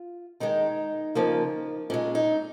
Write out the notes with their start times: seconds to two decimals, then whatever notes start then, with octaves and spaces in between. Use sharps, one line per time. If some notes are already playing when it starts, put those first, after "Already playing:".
Already playing: F4
0.40 D#3 G#3 D#4
1.15 C#3 F3 A#3
1.90 A#2 G#3 C#4
2.15 D#4